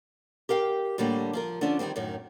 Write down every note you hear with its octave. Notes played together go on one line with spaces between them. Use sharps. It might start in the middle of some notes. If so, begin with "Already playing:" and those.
G4 A#4 F5 G5
A2 D3 G3 A3 A#3 D4
F3 F4 A#4
D3 F3 C#4 D4
D#3 F3 G3 C4
F#2 A2 D#3